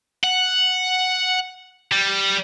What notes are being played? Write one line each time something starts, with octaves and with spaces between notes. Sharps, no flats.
F#5
G3